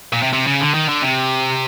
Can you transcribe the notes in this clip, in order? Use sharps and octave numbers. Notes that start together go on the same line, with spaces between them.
A#2
C3
C3
C#3
D3
D#3
D3
C3